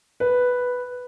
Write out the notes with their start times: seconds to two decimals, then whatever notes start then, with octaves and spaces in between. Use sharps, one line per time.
0.20 B4